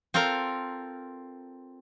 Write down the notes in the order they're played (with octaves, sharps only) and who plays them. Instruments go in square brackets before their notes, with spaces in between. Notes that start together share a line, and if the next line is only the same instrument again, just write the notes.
[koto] C4 F4 A4 A#4 A#5